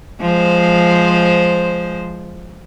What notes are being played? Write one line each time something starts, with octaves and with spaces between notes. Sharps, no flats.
F3 G#3 C5